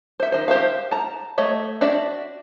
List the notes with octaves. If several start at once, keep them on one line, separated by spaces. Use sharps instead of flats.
C5 E5
D#3 C5
G4 C5 E5 F5
A5 A#5
A3 C#5 D#5 E5
D4 F#4 D5 E5